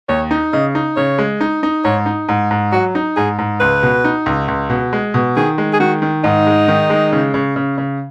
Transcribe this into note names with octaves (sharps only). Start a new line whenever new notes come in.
D#2 C#5
D#4
C#3 D#5
D#4
C#3 C#5
G#3
D#4
D#4
G#2 C#5
D#4
G#2
G#2
F#3 F#4
D#4
G#2 G#4
G#2
C#2 B4
B2
D#4
C#2
C#2
B2
G#3
B2
D#3 G#4
G#3
G#4
D#3 F#4
D#3
G#2 D#4
G#3
D#3
G#3
C#3
C#3
C#3
C#3